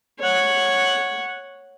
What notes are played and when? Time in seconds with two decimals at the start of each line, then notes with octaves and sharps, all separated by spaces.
0.19 C#5 F#5